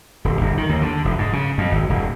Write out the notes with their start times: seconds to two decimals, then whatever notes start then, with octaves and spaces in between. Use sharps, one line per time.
0.25 D#1
0.41 G1
0.57 D#3
0.69 D#2
0.82 D3
1.05 F1
1.18 G#2
1.33 C#3
1.58 F2
1.72 G#1
1.90 D#1